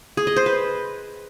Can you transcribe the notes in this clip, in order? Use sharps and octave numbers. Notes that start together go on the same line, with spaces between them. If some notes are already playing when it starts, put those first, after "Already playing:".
G#4
D#5
C5
B4